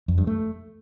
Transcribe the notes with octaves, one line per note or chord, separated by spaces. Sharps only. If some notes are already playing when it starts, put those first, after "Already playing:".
F2
G2
A3